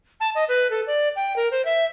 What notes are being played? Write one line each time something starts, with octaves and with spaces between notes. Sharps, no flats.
A5
D#5
B4
A4
D5
G5
A#4
C5
E5